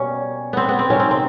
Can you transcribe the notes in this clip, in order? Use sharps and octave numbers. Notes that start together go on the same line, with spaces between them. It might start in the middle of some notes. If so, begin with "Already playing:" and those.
Already playing: B2 G3 A#3 C#4
B3 C4
B3
C4
C3 D#3 F#3 C#4
C4
C4